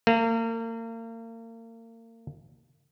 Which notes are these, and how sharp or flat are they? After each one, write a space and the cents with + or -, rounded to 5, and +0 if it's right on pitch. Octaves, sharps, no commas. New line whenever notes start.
A#3 -35